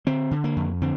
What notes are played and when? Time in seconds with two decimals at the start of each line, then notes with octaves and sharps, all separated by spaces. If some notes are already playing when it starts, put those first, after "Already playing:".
0.07 D3 C4
0.31 D3
0.44 A#3
0.56 F2
0.82 D3 C4